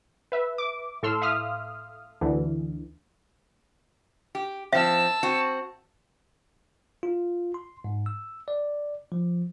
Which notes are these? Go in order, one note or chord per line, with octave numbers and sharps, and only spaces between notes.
B4 E5
D6
A2 A4 C6 E6 F6
E5 F5 D#6 F6
D2 D3 E3
G4
F3 C4 E5 A5 E6
C4 F#4
F4
C6
G#2
E6
D5
F3